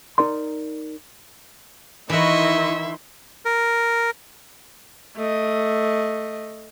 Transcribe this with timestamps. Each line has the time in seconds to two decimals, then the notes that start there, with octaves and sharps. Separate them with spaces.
0.18 D#4 A#4 D5 C6
2.10 D#3 E3 E4 F#4 D#5 E5 C6 C#6
3.45 A#4
5.17 A3 D#5